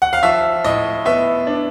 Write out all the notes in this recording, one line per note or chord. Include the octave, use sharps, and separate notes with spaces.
F#5
F5
F3 E5
A2 D#5
B3 E5
D4